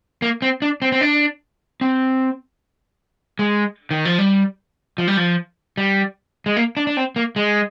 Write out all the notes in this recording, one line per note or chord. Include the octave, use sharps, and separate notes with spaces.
A#3
C4
D4
C4
C4
D4
C4
G#3
D#3
F3
G3
F3
G3
F3
G3
G#3
A#3
D4
D4
C4
A#3
G#3